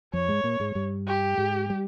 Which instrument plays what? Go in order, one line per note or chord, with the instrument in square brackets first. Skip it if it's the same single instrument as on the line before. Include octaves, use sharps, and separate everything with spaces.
[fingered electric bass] F2 F3 [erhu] C#5
[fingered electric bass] G#2 G#3
A#2 A#3
G#2 G#3
G2 G3
[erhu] G4
[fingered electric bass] G#2 G#3
G3